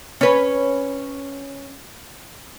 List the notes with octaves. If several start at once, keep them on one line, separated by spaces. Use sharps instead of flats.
C#4 B4